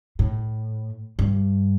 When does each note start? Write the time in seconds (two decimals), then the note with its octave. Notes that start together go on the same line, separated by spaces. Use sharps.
0.19 A2
1.19 G2